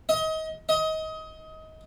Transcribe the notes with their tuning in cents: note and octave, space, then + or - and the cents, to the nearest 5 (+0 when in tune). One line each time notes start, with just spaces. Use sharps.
D#5 +30
D#5 +25